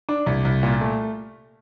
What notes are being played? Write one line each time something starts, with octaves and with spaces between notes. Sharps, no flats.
D4
C2
C2
A#2
A3